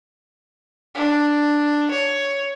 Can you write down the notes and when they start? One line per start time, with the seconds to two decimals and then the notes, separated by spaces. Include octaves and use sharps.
0.95 D4
1.91 C#5